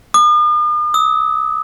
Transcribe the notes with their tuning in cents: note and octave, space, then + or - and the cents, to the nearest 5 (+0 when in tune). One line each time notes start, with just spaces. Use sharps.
D#6 -45
D#6 +45